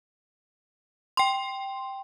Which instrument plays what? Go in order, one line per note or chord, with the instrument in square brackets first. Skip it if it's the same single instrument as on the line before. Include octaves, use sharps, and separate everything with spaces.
[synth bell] G5 C6